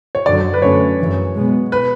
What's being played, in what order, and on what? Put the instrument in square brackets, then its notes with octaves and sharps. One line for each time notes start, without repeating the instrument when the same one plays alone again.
[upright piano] C#5
[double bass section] F#2 D3 F#3 [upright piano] D5
[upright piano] B4
[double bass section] F#2 D3 A3 C#4 [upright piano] C#5
[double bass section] F#2 C#3 E3
B2 G#3 B3
[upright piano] B4